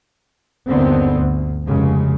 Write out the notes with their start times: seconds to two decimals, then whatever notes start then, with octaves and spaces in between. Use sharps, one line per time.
0.68 G1 D#2 D3 B3 C4
1.16 D2
1.65 F1 C#3 G#3